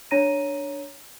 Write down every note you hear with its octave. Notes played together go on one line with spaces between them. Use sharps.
D4 C#5 A#5 A#6 D#7